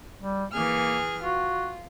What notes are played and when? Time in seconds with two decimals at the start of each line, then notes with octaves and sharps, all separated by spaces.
0.20 G3
0.53 E3 A#3 G#4 F6
1.22 F4 F#4